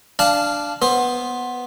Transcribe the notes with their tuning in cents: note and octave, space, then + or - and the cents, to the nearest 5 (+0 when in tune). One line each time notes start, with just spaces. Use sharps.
D4 +0 F5 -10 A5 -15
B3 +0 C5 +15